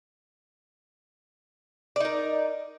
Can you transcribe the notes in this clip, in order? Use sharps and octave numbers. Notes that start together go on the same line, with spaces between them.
D#4 A#4 D5